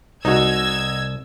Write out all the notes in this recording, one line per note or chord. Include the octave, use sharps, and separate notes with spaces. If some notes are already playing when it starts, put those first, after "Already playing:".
C2 D#4 F#4 E6 G#6